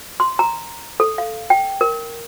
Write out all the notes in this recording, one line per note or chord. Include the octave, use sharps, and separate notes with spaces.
C6
A#5
A4
F5
G5
A#4